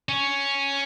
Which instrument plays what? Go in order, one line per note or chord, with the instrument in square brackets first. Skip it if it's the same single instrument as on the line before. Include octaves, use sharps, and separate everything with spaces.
[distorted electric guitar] C#4